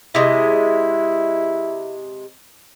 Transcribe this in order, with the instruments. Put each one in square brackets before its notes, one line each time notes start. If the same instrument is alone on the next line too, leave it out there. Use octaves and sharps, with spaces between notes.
[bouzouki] C3 G#3 [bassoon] E4